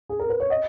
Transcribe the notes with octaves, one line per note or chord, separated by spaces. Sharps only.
G#4
A#4
B4
C#5
D#5